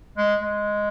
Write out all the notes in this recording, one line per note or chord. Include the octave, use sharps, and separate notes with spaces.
G#3
G#3